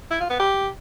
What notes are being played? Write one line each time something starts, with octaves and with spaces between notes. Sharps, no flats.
E4
F4
B3
G4